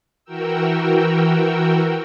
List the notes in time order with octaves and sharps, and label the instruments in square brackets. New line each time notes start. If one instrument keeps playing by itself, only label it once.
[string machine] E3 F#4 A#4 G5 E6